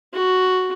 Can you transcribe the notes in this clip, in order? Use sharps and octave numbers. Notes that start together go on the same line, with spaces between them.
F#4